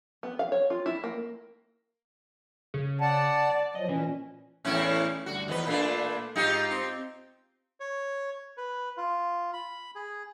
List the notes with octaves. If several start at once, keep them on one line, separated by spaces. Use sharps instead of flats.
B3
F5
C#5
F4
E4
A#3
C#3
D5 F#5 A5
D5
F3 F#3 D#5
A#2 E3 C#4
E2 A2 C#4 E4
D2 G2 D3 F#4
E2 D#3 F3 B4 D#5
A#2 A3 D4 F4 A4 B4
G#2 D#4 F4 G4
C4
C#5
B4
F4
B5
G#4